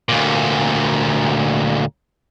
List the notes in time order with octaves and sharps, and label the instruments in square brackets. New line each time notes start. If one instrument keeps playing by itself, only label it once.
[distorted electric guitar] D2 A#2